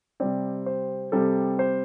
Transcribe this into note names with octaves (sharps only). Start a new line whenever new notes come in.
C3 G3 C4 D5
C5
C3 G3 C4 A4
C5